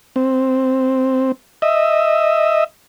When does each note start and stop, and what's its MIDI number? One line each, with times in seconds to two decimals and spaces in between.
0.16 1.32 60
1.62 2.64 75
1.62 2.64 76